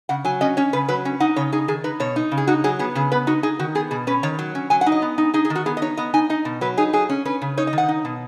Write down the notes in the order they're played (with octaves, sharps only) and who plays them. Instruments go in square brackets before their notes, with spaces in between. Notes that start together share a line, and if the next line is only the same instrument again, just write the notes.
[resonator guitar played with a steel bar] C#3 F#5
F#3 G#5
C#4 D#5
C#4 C#5
C#3 B4
F#3 B4
C#4
D#4 F#5
C#3 C#5
D#4 G#4
D#3 G#4
D#4 B4
B2 C#5
D#4
C#3
G#4
D#4 F#4
F#3 G#4
B3 G#4
C#3 G#4
B3 B4
D#4 F#4
D#4 G#4
D#3 F#4
B3 G#4
B2 G#4
C#4 B4
D#3 C#5
F#3
C#4
F#3 G#5
F#5
D#4
D#5
B3
D#4
D#4 G#4
G#4
D#3
F#4
B3 G#4
D#5
D#4 C#5
B3 D#5
D#4 G#5
D#4 D#5
B2
F#3 B4
D#4 G#4
F#3 G#4
C#4
C#4 B4
C#3
D#4 C#5
D#5
D#3
F#5
D#4
B2